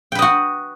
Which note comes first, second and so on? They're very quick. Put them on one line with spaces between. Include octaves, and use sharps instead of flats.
G5 B4 D#5 F#4